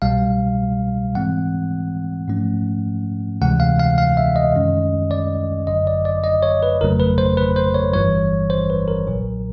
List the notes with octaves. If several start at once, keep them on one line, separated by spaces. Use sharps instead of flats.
C2 B2 G3 F5
G#2 E3 G#3 C4 F#5
G#2 F3 A3 C#4
D2 C3 E3 G#3 F#5
F5
F5
F5
E5
D#5
F#2 D#3 G#3 C#4
D5
G1 F#2 D3 F#3 D#5
D5
D5
D#5
C#5
B4
G1 F2 C#3 F#3 A3 A#4
B4
C5
B4
C5
C#5
G1 G2 E3 G3 C#5
C5
B4
A#4
B1 A#2 F#3